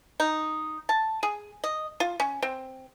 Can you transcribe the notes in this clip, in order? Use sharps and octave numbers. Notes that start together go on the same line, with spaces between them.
D#4
A5
G#4
D#5
F4
C#4
C4